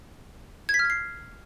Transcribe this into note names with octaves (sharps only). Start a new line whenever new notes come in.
G#6
B6
F6
G#6
C7